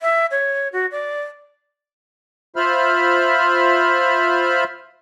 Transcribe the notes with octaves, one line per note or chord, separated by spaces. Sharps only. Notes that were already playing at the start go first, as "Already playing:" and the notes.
E5
C#5
F#4
D5
F4 C5 E5 B5 F6